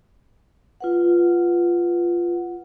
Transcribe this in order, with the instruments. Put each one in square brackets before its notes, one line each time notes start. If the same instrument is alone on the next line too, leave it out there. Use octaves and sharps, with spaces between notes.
[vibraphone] F4 B4 F#5